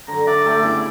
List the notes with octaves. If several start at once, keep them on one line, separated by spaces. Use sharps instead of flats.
D3 F#3 A#5
D5 E5 A#5
F#3 A3 G4
C#3 B3 E4